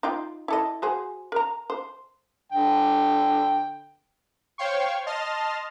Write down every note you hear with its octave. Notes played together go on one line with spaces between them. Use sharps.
D#4 F4 G5
E4 A4 D#5
F#4 G#4 C5
A#4 A#5
C5
D3 G5
C5 C#5 F5 G5 C6 C#6
D#5 A5 C6 F6